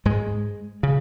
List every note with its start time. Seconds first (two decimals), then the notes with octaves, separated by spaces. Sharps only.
0.05 G#2 G#3
0.83 C#3